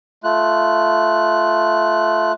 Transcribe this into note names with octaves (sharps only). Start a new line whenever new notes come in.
A3 F4 F#6